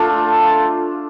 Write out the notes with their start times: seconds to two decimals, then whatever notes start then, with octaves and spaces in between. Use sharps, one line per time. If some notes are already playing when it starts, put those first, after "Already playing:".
Already playing: A3 D4 F4